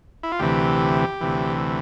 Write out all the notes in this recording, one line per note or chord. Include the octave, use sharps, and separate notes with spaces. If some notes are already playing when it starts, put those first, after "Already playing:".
E4
F4
D2 C3 E3 G4
D2 C3 E3